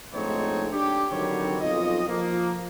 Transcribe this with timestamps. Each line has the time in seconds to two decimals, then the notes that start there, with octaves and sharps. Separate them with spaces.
0.14 A#1 G#2 A3 C4 D#4 C#5
0.71 D4 G4
1.11 D3 D#3 F#3 G3 C4 C#5
1.61 B1 F2 F4 D#5
2.08 F3 A#3